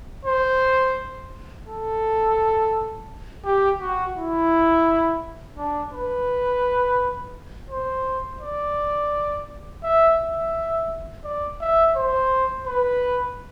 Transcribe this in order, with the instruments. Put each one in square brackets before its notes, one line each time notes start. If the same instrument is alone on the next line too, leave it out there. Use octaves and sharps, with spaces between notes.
[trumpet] C5
A4
G4
F#4
E4
D4
B4
C5
D5
E5
E5
D5
E5
C5
B4